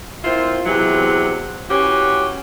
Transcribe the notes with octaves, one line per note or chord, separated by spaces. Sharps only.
A#3 C4 E4 F4
E2 C3 E3 F#3
E3 C#4 F#4 G4